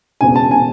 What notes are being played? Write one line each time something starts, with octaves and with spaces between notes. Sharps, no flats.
E1 E2 C#3 G#5
A5
C#3 G#5